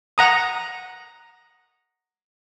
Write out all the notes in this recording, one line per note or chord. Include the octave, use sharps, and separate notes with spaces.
F#5 A#5 D#6